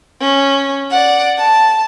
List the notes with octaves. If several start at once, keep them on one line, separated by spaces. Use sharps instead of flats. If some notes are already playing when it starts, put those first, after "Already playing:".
C#4
D5 F#5
A5